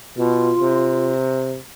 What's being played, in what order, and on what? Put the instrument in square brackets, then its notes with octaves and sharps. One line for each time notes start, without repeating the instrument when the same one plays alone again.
[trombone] B2 [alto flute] F4
[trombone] C3